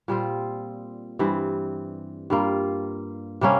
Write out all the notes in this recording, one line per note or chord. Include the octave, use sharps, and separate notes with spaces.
A#2 G3 C4 F4
G2 E3 G3 C4
G2 G3 A#3 F4
C3 G3 A#3 C#4